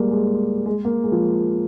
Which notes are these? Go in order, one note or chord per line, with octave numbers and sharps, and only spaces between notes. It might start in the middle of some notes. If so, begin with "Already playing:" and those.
Already playing: G3 G#3 A#3
G#3
G#3
A#3
G#3
F3